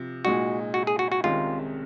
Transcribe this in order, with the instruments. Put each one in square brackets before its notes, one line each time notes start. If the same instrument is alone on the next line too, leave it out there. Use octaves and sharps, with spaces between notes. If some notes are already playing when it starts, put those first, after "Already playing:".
Already playing: [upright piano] C3 F3
[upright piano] A#2 G#3 D#4 [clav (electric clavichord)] F#4
[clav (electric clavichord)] F#4
G#4
F#4
F#4
[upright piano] C2 C3 D#3 G#3 C#4 [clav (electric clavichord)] F4